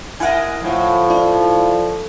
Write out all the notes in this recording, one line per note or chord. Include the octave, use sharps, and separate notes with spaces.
E4 A#4 D#5 F#5 G#5
A2 F3
E4 D5